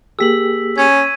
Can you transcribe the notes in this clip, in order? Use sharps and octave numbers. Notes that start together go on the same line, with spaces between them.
A#3 G4 G#4 E6 B6 F#7
C#4 G#6 D#7